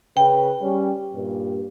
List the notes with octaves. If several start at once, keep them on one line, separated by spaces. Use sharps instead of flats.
C#3 B4 G5
G3 C#4
G2 A#2